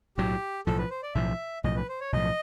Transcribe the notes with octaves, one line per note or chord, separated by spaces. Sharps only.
B1 A2 F#3 G4
B1 A2 F3 A4
B4
C5
D5
B1 A2 F3 E5
B1 A2 F3 D#5
B4
C5
C#5
B1 A2 F3 D#5